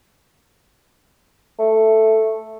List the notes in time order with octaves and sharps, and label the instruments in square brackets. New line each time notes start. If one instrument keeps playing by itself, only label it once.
[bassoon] A3